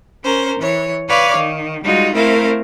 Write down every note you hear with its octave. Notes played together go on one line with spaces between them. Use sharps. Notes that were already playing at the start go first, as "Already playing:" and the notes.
C#4 A#4 C5
E3 C#5
B4 C#5 D5 F5 D6
D#3
G3 G#3 D#4 F4 F#4
A3 C4 E4 A#4 C5 F5